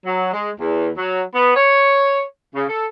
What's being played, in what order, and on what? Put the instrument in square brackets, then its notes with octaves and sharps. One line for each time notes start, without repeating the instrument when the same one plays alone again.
[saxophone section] F#3
G#3
E2
F#3
B3
C#5
C#3
A4